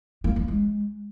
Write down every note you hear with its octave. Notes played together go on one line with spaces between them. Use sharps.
A#3
A#3
G#3